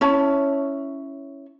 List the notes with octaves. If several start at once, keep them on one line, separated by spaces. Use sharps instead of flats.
C#4 E4 C#5 A5